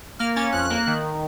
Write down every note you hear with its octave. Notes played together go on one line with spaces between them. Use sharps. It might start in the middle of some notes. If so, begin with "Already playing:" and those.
A#3 F6
C#4 A6
F2 F#6
A#3
D#3